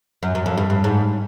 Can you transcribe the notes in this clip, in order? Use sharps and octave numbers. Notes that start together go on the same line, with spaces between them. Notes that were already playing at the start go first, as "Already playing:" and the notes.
F#2
F#2
F2
G2
G2
G#2